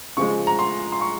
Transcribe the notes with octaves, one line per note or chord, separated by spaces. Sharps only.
C#3 F3 G#3 C#6
A#5
C6
C6
C#6